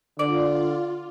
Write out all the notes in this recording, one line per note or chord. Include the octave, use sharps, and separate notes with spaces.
D3 F4 D5